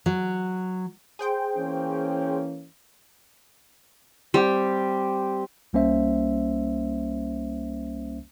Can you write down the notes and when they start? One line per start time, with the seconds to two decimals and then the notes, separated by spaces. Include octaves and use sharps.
0.06 F#3
1.19 G#4 C5 G5
1.56 E3 A#3 C#4
4.34 G3 C4 G4
5.73 C2 G3 A#3 C#4 C5 E5